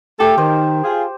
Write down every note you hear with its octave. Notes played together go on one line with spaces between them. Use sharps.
A3 G4 A4
D#3 C5
F4 G#4